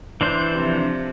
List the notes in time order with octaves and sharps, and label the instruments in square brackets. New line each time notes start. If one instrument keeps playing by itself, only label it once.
[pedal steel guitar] E3 D4 C5 [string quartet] G6
[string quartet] C3 F3